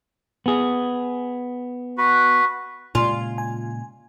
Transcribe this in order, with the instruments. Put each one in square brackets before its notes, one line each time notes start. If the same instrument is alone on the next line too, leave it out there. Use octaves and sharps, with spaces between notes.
[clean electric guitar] B3 G#4
[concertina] F#4 B4
[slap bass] A#2 C#3 G#3 [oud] F4 [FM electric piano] G#5 C6
[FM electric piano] G#5